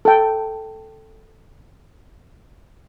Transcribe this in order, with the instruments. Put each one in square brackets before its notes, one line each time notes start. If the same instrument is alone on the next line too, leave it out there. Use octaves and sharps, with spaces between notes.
[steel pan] A4 G5